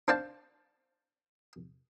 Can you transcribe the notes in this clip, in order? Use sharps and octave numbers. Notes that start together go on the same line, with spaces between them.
D4 C5 D5 F5 G5 A5